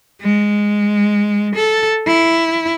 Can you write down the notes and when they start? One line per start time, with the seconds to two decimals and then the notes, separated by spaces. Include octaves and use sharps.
0.21 G#3
1.55 A4
2.07 E4